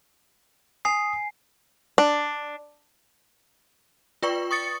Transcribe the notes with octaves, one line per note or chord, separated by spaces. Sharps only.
G#5 D#6 C7
D4
F4 B4 D5 G5 C#6
C#6 D#6 A6 C#7